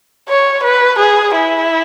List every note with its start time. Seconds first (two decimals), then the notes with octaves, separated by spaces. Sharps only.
0.29 C#5
0.64 B4
0.99 G#4
1.35 E4